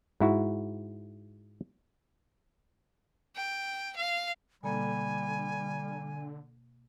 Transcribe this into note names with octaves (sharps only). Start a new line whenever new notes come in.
G#2 E4 F#4
G5
F5
B2 D3 G3 A#3 A4 G#5